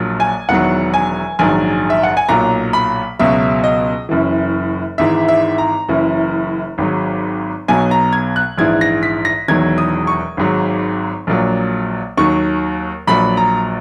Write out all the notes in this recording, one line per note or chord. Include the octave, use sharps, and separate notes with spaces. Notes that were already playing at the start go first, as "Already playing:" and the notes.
Already playing: A#1 A#2 F#3
G#5
E1 E2 D#3 F#3 F#5
G#5
A#1 G#2 D#3 F#3 G#5
E5
F#5
G#5
B1 A#2 F#3 A#5
B5
C#2 B2 F#3 E5
D#5
F#1 F#2 E3
G#1 G#2 E3 E5
E5
A#5
F#1 F#2 E3
G#1 G#2 F#3
B1 B2 F#3 G#5
A#5
G#6
F#6
A#1 G#2 E3 G#6
A#6
B6
A#6
E1 E2 D#3 F#3 G#6
D#6
C#6
G#1 G#2 F#3
A#1 A#2 F#3
D#2 D#3 F#3 C#6
A#1 A#2 F#3 B5
A#5